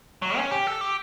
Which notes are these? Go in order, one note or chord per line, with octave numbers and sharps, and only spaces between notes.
F#3
C#4
G4
A4
G4